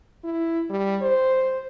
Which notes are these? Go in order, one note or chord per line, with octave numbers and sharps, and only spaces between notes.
E4
G3
C5